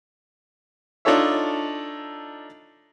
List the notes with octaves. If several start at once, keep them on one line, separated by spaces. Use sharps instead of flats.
D4 D#4 F4 A4 C#5 E5